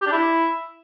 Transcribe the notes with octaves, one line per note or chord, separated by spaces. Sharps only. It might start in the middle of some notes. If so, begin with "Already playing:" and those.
G4
D4
E4